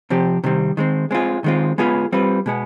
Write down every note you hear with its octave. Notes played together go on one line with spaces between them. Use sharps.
C3 F3 C4 G4
C3 D#3 G3 C4
D#3 G#3 C4
G#3 C4 F4 G#4
D#3 G#3 C4 F4
G#3 B3 F4 G#4 B4
G3 C4 F4 B4
B2 G#3 B3